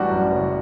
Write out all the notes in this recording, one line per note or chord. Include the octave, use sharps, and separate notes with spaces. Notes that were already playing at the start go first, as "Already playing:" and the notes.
Already playing: A1 G3 D4 F#4
F#2
F#1